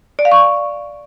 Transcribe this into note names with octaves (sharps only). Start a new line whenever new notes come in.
D5
F5
C#6